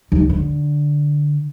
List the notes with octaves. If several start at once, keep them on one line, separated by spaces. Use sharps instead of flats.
D#2
D3